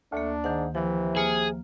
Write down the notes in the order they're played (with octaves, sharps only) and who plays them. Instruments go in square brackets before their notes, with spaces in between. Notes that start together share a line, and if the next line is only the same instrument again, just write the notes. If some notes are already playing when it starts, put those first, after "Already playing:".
[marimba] D2 A#3 [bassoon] A3 [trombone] D4
[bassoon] G#2 [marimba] D#3 F#5
[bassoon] C3 [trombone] E3 [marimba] F3
[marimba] A#3 F6 [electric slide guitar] G#4